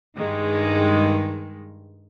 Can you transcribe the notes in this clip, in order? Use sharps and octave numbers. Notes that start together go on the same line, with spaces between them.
G2 D#3 G#3